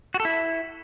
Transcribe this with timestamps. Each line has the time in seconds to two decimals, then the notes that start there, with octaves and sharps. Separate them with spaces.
0.14 F#4
0.20 A4
0.25 E4